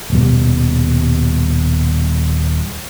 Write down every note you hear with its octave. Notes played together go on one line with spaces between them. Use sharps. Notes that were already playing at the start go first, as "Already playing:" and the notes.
D#1 B2 G3